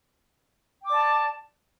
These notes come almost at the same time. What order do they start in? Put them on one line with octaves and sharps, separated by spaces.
G5 D6 D5 A5